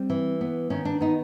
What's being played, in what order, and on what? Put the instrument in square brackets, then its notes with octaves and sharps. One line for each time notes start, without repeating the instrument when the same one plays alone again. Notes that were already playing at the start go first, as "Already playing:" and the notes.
Already playing: [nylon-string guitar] G3 C4
E3
B3
D#3 C#4
D4
B3 D#4